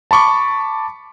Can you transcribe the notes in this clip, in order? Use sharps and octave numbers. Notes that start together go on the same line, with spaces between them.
A5 B5 C#6 D6